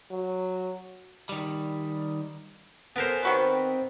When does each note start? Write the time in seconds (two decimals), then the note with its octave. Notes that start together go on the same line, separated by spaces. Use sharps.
0.11 F#3
1.29 D#3 G3
2.96 B3 A4 A#4 C5 G#5
3.23 D#3 C4 F#4 B4